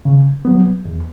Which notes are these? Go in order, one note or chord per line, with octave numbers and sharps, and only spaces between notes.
C#3
F#3 B3
E2